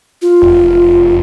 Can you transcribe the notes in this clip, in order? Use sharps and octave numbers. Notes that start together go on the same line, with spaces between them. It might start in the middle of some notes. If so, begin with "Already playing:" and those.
F4
F1